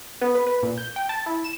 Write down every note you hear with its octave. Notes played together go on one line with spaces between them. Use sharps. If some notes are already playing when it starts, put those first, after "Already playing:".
B3
B4
B4
A#2
G6
G5
A5
E4
E7